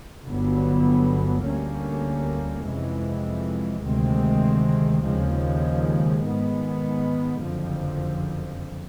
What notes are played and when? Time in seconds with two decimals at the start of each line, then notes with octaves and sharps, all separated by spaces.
0.24 G1 G2 D3 F#3 B3
1.44 D2 D3 G3 A#3 C#4
2.64 F2 C3 E3 G#3
3.84 D2 C3 D#3 G#3 C4
5.04 D#2 C#3 F3 G#3
6.24 G#2 D#3 G#3 B3
7.43 F#1 F2 D3 F3